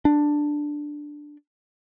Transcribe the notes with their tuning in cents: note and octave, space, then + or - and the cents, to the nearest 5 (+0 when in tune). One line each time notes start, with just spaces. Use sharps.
D4 +5